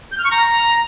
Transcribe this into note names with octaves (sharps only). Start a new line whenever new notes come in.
G6
F6
C#6
A#5